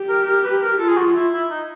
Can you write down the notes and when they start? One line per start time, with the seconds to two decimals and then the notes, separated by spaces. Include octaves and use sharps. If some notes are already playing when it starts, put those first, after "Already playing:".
Already playing: G4
0.09 A#4
0.27 A#4
0.44 B4
0.62 A#4
0.79 F4 A4
0.88 G#4
0.97 F#4
1.15 E4
1.33 E4
1.51 D#4